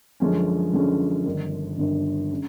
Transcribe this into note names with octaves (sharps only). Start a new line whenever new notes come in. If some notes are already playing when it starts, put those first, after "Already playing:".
F#2 D3 F3 G#3 C#4
F#2 D3 F3 G#3 C#4
G1 G2 D#3
G1 G2 D#3
C#3